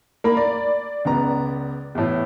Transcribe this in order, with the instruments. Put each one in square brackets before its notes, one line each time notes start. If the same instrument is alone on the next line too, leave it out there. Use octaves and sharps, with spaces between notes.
[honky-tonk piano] A#3 [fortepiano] A#5 B5
[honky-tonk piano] D5
[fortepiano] C#2 B3 A#5
E2 A2